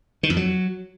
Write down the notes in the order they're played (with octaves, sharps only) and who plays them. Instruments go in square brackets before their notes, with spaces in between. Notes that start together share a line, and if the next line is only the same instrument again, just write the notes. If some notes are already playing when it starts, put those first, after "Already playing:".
[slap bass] D#3
F2
F#3